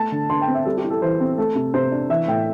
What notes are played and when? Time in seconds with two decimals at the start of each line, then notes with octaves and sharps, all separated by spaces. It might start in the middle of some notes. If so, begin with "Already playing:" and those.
Already playing: A3 A5
0.12 D3
0.30 D3 C6
0.42 G5
0.48 C4
0.55 E5
0.65 G3 A4
0.77 G4
0.84 E4
0.90 A4
1.02 E3 C5
1.20 C4
1.38 A3 A4
1.55 C3
1.74 C3 C5
1.92 D4
2.10 E3 E5
2.28 A2 G5